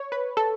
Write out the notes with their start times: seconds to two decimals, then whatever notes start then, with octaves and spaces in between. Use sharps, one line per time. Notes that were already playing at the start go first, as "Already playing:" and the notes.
Already playing: C#5
0.12 B4
0.37 A4